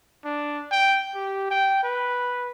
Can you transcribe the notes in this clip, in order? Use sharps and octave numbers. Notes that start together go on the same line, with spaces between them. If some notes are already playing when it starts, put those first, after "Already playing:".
D4
G5
G4
G5
B4